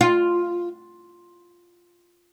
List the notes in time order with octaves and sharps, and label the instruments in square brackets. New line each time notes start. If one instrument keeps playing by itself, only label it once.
[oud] F4